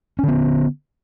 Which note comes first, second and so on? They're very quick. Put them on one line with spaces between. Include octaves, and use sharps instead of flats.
C#4 D3 B3